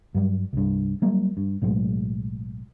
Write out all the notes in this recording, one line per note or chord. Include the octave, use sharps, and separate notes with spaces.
G2 F#3 G3
C2 G2
F#3 G3 A#3
G2
B1 A2 F#3 G#3